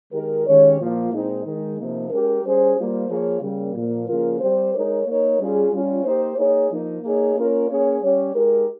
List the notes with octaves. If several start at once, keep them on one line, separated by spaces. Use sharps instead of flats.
D#3 G#3 D#4 G4 A#4
D#3 G#3 C#4 G4 C#5
A#2 F3 A#3 F4
A#2 G#3 C4 D#4
D#3 G#3 D#4
C3 F3 A#3 D#4
G#3 C#4 G4 A#4
G3 C#4 G#4 C5
G3 A#3 F4 C5
F3 A#3 F4 G#4 C#5
C#3 G3 A#3
A#2 F3 A#3
C#3 F3 A#3 F4 A#4
G3 C4 G4 C5
G#3 D#4 A#4 C#5
A#3 D#4 A#4 C#5
G3 C#4 F4 G#4
G3 C#4 F4
A#3 D#4 G4 C5
A#3 D#4 G#4 C#5
F3 A#3 D#4
A#3 D#4 G#4 C#5
A#3 C#4 F4 A#4 C#5
A#3 C#4 G#4 C#5
G3 C#4 G4 C#5
G#3 D#4 G4 A#4